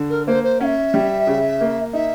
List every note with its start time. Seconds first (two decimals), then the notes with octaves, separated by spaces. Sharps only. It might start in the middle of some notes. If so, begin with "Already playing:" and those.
Already playing: D3
0.10 A#4
0.27 A#3 C5
0.43 C5
0.60 C#4 E5 F#5
0.94 G3
1.27 C#3
1.61 A#3
1.93 D#4 E5